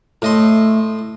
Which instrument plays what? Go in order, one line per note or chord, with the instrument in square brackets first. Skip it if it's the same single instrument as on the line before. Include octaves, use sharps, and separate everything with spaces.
[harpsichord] A2 D#5 C6 [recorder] A3